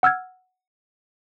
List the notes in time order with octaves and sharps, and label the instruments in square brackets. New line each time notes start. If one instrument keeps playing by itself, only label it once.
[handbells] F#5 E6 F6 G#6